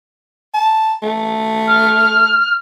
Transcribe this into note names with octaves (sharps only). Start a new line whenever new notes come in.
A5
A3
F6